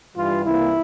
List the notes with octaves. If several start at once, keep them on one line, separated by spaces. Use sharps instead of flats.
G2 E3 G3 F4
C2 C3 E3 A#3 E4